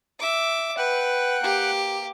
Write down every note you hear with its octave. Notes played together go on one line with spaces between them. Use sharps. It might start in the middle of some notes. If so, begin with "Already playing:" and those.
E5 D6
B4 F#5 G5 F#6
A#3 G4